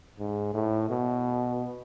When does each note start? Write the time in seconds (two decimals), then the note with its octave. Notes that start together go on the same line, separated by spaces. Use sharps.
0.19 G#2
0.54 A2
0.90 B2